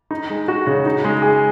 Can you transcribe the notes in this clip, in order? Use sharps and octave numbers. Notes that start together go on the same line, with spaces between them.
D#4
G#3
F#4
C#3
D#4
G#3
G#4